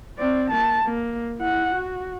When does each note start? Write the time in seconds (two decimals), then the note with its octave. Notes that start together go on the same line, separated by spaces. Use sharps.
0.18 C4 D5
0.50 A#3 A5
0.84 A#3
1.39 E4 F#5
1.74 F#4